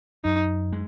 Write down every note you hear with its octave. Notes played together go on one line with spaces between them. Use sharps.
F#2 D#4
G#3